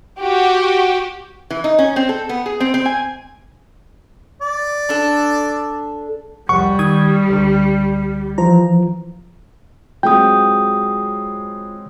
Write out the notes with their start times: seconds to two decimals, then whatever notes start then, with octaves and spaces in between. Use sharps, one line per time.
0.20 F#4 G4
1.50 E3
1.64 D#4
1.79 C#4
1.96 C4
2.09 A4
2.29 B3
2.46 G#4
2.60 C4
2.74 C4
2.85 G#5
4.41 D5
4.89 D4 A4
6.49 C2 F2 G3 F#5 C#6
6.79 D#3 D#6 G#6
7.29 C#2 D3
8.38 E3 F3 A#5
10.03 F#3 G#3 C4 F4 G5 D#6